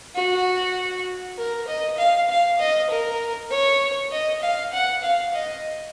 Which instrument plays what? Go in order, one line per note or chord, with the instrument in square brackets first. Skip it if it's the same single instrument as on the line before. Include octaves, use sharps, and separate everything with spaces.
[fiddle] F#4
A#4
D#5
F5
F5
D#5
A#4
C#5
D#5
F5
F#5
F5
D#5